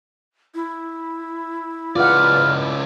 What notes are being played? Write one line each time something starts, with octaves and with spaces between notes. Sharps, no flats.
E4
C#2 F4 G#4 B4 D5 F#5 F6